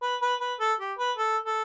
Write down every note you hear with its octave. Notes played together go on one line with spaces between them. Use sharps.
B4
B4
B4
A4
G4
B4
A4
A4